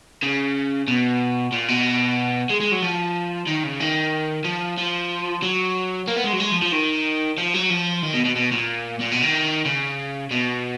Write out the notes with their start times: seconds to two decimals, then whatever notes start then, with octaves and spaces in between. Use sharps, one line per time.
0.23 C#3
0.88 B2
1.52 A#2
1.69 B2
2.50 G#3
2.61 G#3
2.72 F#3
2.83 F3
3.47 D#3
3.64 C#3
3.80 D#3
4.44 F3
4.78 F3
5.43 F#3
6.08 A#3
6.16 B3
6.24 G#3
6.33 F#3
6.40 G#3
6.52 F3
6.62 F3
6.72 D#3
7.38 F3
7.54 F#3
7.70 F3
8.02 D#3
8.14 B2
8.25 B2
8.35 B2
8.52 A#2
9.00 A#2
9.12 B2
9.22 D#3
9.65 C#3
10.31 B2